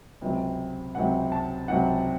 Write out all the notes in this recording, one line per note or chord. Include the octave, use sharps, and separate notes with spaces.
C#2 C3 F#3
C#2 C3 F#3 F#5
A5
C#2 C3 F#3 F#5